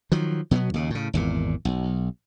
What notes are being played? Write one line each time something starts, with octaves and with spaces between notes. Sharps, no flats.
D#3 F3 F#3
B2 F#3 G#3 B3
D#2 C#3
A2 C#3
G#1 E2 A#2
B1